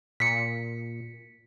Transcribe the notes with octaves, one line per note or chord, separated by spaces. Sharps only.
A#2 B6 C#7